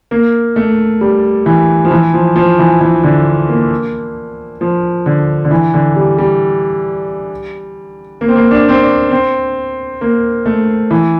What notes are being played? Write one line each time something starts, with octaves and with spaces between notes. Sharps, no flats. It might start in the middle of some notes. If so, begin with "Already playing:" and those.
A#3
A3
G3
E3
F3
E3
F3
F3
E3
E3
D3
A#3
F3
D3
D3
E3
D3
G3
G3
A#3
C4
A#3
D4
C4
D4
C4
A#3
A3
E3